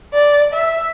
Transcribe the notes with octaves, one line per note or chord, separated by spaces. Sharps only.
D5
E5